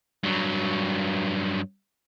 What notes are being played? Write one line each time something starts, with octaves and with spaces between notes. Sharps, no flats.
G2 F#3